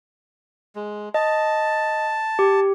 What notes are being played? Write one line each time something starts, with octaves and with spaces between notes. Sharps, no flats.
G#3
D#5 A5
G4